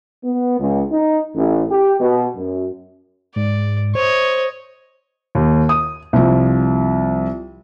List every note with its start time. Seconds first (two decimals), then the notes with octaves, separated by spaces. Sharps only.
0.24 B3
0.59 C#2
0.93 D#4
1.36 A1
1.71 G4
2.00 B2
2.37 F#2
3.36 G#2 D5
3.95 C5 C#5 D#5
5.35 D#2
5.69 D#6
6.13 C2 F3